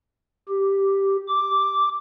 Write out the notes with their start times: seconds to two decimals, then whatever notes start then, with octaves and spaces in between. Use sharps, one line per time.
0.49 G4
1.28 D6